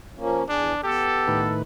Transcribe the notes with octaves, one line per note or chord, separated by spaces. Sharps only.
F3 A#3 C#4
E2 D4 G#4
B3 G4 A4
A2 D#3 B4